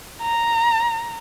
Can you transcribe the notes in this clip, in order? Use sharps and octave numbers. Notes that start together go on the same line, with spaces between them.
A#5